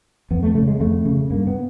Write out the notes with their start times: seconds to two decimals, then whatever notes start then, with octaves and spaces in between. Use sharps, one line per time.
0.31 F2 B3
0.43 A3
0.55 C#3 A3
0.68 G#3
0.80 F2 A3
1.05 C#3
1.30 G2 A#3
1.47 B3